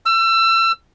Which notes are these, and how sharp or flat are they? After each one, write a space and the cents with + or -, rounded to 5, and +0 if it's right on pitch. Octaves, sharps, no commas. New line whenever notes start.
E6 +30